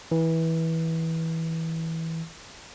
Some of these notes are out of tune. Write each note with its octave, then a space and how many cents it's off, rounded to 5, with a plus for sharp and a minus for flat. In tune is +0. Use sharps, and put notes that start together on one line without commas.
E3 -20